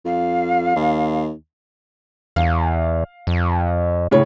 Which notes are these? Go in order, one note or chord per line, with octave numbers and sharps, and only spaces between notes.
F2 F5
D#2
E2 F5
F2
A2 C#3 C#5